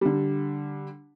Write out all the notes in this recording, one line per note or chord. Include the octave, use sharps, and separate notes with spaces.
D3 G3